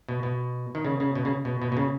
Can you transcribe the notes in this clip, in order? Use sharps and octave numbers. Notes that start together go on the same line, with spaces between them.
B2
B2
D#3
C#3
C#3
B2
C#3
B2
B2
B2
C#3